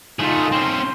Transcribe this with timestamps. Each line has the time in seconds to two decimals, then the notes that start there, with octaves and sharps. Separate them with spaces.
0.19 A3 D#4 F4 G#4
0.52 C4 C#4 C6